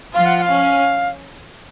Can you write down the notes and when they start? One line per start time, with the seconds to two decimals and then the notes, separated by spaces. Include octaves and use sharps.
0.13 F3 F4 F5
0.26 F#5
0.37 F#5
0.42 F5
0.49 C#4